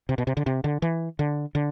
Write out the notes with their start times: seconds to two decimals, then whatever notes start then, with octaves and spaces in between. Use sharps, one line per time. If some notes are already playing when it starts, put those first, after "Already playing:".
0.09 C3
0.18 B2
0.27 C3
0.37 D3
0.46 C3
0.64 D3
0.82 E3
1.19 D3
1.55 D3